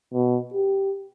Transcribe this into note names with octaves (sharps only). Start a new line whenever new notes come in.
B2
G4